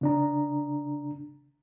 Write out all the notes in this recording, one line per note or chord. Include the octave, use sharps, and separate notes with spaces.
C#3 D4 A#5